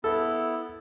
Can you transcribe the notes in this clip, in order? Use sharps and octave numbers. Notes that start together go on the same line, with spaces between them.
B3 E4 A4